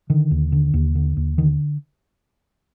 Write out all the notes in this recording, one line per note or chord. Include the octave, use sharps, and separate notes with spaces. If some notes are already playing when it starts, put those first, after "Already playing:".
D3 D#3
D#2
D3
D#2
D3
D#2
D3 D#3